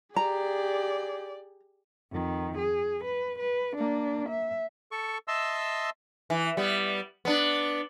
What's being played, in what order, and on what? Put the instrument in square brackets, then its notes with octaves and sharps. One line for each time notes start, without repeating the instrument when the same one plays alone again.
[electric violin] G4 G#4 [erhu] D5 [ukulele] A#5
[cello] F2 D#3
G#4
B4
B4
A#3 D4
E5
[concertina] A4 C#6
D#5 E5 A5 C6 E6
[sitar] E3
G3 B3
B3 D4